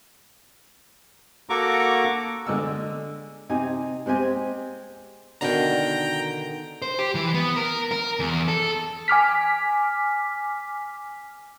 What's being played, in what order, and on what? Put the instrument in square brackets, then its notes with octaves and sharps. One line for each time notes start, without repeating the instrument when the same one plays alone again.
[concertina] A#3 F#4 A4 A#5 C#6 D6
[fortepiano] D3 G#3 E6
C3 D#4 G#5
G#3 C4 G4 G#5
[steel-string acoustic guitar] B2 D3 D#3 [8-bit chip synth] G5 A#5
[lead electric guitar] C5
G4
E3
B3
A#4
A#4
E2
A4
[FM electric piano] G#5 D6 F6 B6